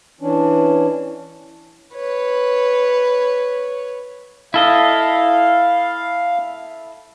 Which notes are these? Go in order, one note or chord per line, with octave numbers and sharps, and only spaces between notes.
E3 C#4 D4
B4 C#5
E4 A4 D#5 F5